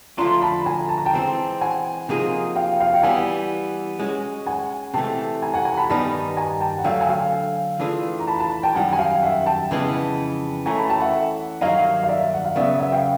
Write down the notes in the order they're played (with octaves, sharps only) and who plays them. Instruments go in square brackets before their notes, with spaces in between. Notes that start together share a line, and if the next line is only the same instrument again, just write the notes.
[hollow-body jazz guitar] D3 F3 A3 D4 F4 [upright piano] A#5 C6
[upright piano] A5 B5
G#5 A#5
A5
A#5
G5 A5
[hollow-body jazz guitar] E3 G#3 C4
[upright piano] F#5 G#5
[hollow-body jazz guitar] C3 F3 A#3 D#4 G#4
[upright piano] F5 G5
F5 G5
G5
[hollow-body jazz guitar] E3 G3 B3 [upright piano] F#5 G#5
[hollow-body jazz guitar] G#3 C#4 F#4
[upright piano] F#5 G#5
[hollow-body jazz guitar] C3 E3 A3 [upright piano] G5 A5
[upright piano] G#5 A#5
F#5 G#5
G#5 A#5
A5 B5
[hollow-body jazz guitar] G2 D#3 G3 B3 D#4 [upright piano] A5 B5
[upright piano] G#5 A#5
G5 A5
F#5
[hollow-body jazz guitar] D3 F#3 A3 [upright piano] F5 G5
[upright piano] G#5
F5 G5
[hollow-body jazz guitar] E3 A3 D4 F4 G#4
[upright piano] A#5
A5 B5
A5 B5
G5 A5
[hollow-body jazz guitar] F#2 D#3 G3 [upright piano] F#5 G#5
[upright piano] G#5
F5 G5
E5 F#5
G5 A5
[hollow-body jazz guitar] F2 C#3 E3 G#3 B3
[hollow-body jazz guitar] E3 A3 C#4 [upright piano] G#5 A#5
[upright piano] A5 B5
G5 A5
E5 F#5
[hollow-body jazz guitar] G2 D#3 F#3 A#3 D#4 [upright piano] D#5 F5
[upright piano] F5
D5 E5
F#5
F5
[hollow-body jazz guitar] C#3 F#3 B3 [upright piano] D5 E5
[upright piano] E5 F#5
F5 G5